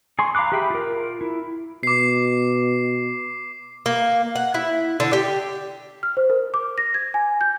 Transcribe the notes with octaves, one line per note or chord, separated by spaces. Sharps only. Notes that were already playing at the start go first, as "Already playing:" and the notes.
G#4 G#5 C6 C#6
F5 A#5 B5 D6 F#6
G4 G#4 E5 G5 B5
F4 A#4
E4
B2 D6 C7
A#3
F#5
E4
D3
G4
F6
C5
A#4
D6
A#6
G#6
G#5
G6